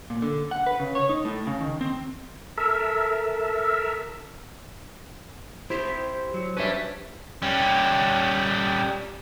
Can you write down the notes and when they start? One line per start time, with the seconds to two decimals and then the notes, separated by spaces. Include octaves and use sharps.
0.10 A#2
0.22 D3
0.51 F#5
0.66 B4
0.80 C#3
0.95 C#5
1.09 D#4
1.25 A2
1.47 C#3
1.61 D#3
1.81 C4
2.58 A4 A#4 E5
5.70 E4 G4 C5
6.34 F#3
6.57 G2 G3 C#4 B4 E5
7.42 G3 C#4